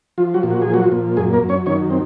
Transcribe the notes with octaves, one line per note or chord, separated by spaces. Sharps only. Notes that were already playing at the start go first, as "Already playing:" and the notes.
F3 F4
F#3 F#4
A#2
F#4
G#4
F3
F#3 F#4
A#2
F#2 G#3 G#4
A#3 A#4
F#2
C#4 C#5
D#3 C#4 C#5
C4